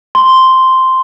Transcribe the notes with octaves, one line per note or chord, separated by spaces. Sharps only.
C6